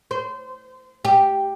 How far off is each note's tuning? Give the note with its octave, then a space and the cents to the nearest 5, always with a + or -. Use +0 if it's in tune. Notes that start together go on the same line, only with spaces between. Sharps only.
C5 -25
G4 +0